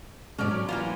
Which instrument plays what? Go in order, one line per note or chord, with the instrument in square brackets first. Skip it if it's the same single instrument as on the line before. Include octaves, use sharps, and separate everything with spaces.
[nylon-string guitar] G#2 B2 D3 [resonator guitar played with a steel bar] C#4 D5
[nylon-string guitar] F#3
[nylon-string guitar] E3 [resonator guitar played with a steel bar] A#3 B3 F4